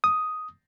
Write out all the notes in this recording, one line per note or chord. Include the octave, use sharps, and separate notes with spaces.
D#6